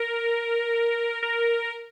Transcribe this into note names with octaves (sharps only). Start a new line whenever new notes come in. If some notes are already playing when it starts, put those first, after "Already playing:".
Already playing: A#4
A#4